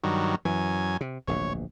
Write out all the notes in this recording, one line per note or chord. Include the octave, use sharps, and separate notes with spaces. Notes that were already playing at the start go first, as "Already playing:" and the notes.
G2 D#3 F#3
F#2 E3 G#5
C3
D1 A#1 B2 C#5